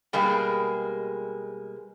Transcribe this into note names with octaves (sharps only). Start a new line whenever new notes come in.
B2 G3 G#3 A#3 G#4